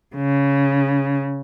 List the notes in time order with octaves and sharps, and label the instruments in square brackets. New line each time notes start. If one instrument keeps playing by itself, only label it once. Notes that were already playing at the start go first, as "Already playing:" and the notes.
[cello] C#3